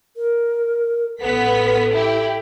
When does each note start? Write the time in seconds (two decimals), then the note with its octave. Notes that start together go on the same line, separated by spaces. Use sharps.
0.17 A#4
1.21 A1 B3 A4 B6
1.93 E4 G4